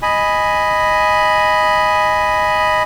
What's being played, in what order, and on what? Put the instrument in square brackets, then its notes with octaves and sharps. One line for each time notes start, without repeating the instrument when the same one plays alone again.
[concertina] D#5 G#5 B5